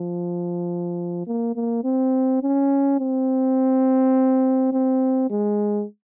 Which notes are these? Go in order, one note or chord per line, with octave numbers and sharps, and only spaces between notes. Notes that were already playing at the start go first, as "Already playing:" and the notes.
Already playing: F3
A#3
A#3
C4
C#4
C4
C4
G#3